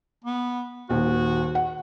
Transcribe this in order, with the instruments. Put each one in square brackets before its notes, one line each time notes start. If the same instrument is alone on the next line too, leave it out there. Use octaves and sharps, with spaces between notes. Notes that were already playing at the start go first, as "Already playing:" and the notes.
[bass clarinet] B3
[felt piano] D#1 D#2 [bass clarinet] F#4
[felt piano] F#5